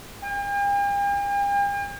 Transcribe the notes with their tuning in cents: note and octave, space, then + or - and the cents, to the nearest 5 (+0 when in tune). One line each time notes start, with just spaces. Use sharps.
G5 +45